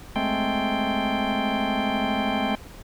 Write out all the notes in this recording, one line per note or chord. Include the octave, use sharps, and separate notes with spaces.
G#3 A3 C4 G5